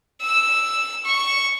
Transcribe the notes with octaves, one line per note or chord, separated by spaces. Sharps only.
E6
C#6